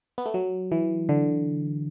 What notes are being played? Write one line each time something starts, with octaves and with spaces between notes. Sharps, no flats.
B3
A3
F#3
E3
D3